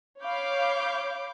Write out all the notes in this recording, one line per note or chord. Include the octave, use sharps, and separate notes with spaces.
C#5 F5 B5 D6 G6